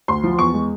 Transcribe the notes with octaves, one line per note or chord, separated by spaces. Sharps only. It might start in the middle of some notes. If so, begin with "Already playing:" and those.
D2 C6
F3
E2 C#6
G#3